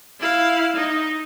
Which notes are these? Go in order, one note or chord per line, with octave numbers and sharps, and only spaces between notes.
E4 F5
D#4